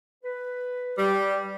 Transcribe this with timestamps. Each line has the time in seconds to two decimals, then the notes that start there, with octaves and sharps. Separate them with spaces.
0.24 B4
0.98 G3